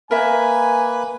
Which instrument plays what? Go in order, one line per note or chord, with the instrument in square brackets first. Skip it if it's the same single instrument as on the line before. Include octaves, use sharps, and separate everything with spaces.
[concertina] A#3 B4 [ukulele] A#4 E5 [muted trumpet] G#5